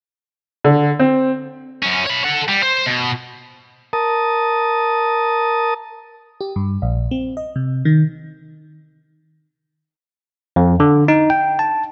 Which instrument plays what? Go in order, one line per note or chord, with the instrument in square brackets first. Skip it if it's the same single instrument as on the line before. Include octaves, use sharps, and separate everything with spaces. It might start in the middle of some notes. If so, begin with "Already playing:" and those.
[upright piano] D3
C4
[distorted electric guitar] F#2 C#4
C#5 B5
A4 F#5
G3
C5
B2
[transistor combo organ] A#4 A5 D#6
[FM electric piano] G4
G2
A#1
C4
D#5
C3
D#3
[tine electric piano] F2
D3
D#4
G5
A5